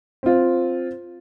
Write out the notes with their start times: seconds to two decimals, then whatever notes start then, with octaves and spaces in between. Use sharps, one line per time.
0.23 C4 F4